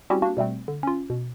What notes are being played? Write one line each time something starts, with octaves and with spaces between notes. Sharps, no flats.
G3 C4 C#4 E4 F#4 G4
A#3 D4 F#4
B2 G3 A3 C4
D3
C#4 F4
B2